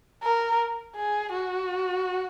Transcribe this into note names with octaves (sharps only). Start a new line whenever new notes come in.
A#4
G#4
F#4